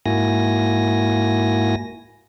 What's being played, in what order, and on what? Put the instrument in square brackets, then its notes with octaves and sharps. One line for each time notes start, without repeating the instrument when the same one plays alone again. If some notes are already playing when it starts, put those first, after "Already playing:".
[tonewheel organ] G#2 A#3 E4 F#4 G#5 A#6